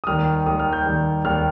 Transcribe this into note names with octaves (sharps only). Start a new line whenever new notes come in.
D#6
D#2 D#3 G3 F6
D#2 D#3 G3 D#6
F6
G6
D#2 D#3 G3
D#2 D#3 G3 F6